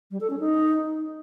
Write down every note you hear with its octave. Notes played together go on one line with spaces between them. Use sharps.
G3
A4
C#4
D#4